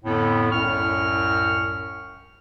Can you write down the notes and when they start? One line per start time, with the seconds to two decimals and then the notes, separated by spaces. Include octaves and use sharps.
0.05 F2 A2 D3 B3
0.52 C2 F#2 A2 C#6 F6